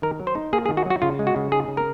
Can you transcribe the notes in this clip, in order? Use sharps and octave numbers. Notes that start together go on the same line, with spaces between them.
D#3 A#4
F#3
C5
D#4
A#3 G#4
G#4
D#3
F#4
F#3
F#4
C#3 F4
G#3
F#4
C#3
D#4 G#4
C#3
A#4